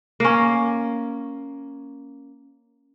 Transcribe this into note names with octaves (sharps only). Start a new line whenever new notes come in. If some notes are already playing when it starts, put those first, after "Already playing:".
A#3 C#4